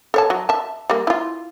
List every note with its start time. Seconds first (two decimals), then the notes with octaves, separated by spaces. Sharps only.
0.14 A4 C#5 A5
0.30 F#3
0.49 E5 A5
0.90 G3 A#3
1.07 E4 F4